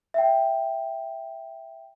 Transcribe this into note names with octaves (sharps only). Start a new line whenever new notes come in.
E5 G5